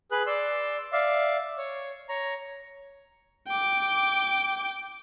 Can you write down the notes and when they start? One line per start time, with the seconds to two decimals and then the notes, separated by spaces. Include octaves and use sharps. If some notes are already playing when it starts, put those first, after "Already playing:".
0.11 G#4 B4 F#6
0.27 D5 C6 E6
0.92 D5 E5 F5
1.58 C#5
2.09 C#5 A#5
3.48 G5 D6